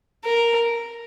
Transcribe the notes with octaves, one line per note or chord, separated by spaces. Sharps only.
A#4